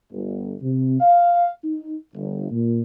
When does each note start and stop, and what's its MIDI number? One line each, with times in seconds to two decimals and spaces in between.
0.12 0.53 31
0.61 0.96 48
1.00 1.48 77
1.64 1.96 63
2.14 2.51 31
2.51 2.83 46